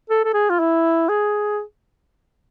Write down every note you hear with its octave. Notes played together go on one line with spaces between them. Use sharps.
A4
A4
G#4
F4
E4
G#4